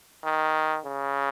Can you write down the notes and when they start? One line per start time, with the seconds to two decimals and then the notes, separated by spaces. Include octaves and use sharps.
0.24 D#3
0.85 C#3